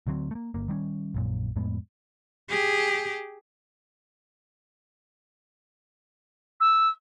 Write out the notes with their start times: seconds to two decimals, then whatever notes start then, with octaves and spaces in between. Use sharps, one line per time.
0.07 D2 D3 F#3 C4
0.31 A3 A#3
0.54 G1 A#3
0.68 D#3 G3 C4 C#4
1.14 A#1 F#2 A#2
1.56 F2 A2 G#3 B3
2.49 G4 G#4
6.60 E6